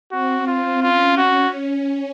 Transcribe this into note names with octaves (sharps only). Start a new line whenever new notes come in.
C4 F#4
F4
C#4 F4
F#4